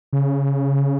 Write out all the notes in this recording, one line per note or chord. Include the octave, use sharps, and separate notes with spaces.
C#3